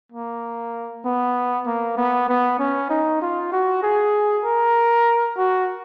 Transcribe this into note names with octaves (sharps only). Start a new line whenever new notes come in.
A#3
B3
A#3
B3
B3
C#4
D#4
F4
F#4
G#4
A#4
F#4